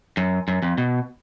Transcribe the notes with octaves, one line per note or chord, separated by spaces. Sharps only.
F#2
F#2
F2
B2